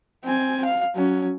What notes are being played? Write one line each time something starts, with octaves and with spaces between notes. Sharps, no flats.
C4 G#5
F5
F#3 C#4